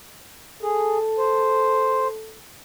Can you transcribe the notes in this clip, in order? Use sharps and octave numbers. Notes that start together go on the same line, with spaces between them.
G#4 A4
C5